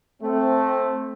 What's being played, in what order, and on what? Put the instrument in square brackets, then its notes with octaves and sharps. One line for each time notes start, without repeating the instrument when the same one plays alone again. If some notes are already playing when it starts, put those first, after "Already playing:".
[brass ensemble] A3 C4